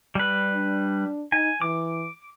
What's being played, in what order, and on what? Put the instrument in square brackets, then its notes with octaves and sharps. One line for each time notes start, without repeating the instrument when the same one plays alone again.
[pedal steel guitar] G3 B4
[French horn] D4
[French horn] D#4 [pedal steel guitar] G#5
[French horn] E3 [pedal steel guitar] D6